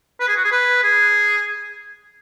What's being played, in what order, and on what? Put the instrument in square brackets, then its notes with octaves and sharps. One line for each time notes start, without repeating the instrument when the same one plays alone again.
[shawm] B4
G#4
F#4
G#4
B4
G#4